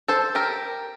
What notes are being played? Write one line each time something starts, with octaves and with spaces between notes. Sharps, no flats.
A4 C5
G4 A#4